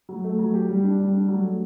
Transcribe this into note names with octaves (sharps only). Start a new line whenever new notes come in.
F#3
A3
F#3
G4
G3
D4
G3
D4
F#3
A3